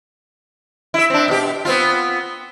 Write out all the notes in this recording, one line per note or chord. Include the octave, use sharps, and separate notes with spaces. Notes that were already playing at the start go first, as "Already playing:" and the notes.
E4 E5
C4 D4
B2 G4
B3 C4 F4